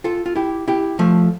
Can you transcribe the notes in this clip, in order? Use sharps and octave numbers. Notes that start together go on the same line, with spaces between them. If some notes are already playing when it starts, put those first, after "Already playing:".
F4 A4
F4
E4 G4
E4 G4
F3 A3